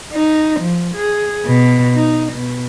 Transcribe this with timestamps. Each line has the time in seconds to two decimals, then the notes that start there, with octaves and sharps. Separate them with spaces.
0.13 D#4
0.61 F3
0.95 G#4
1.46 B2
1.96 D#4
2.33 B2